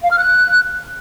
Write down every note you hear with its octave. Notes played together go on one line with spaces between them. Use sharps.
F5
F6
F#6